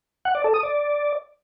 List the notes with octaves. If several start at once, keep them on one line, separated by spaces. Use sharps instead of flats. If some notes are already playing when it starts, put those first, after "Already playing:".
F#5
D5
A4
D#6
D5